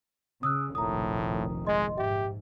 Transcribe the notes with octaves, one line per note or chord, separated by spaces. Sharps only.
C#3 D#6 E6 F#6
F1 A#1 A2 D#3 A#5 D#6
G#3 D#5 C6
G#2 G4 E5